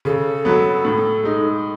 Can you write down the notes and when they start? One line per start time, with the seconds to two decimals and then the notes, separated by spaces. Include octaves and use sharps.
0.05 C#3 A4
0.45 F#3 B3
0.85 A2
1.24 G#3 D#4